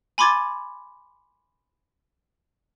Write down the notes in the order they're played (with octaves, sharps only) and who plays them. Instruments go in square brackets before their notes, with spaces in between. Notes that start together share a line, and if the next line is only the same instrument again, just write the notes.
[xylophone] G#5 B5 C6 D6 G#6 A6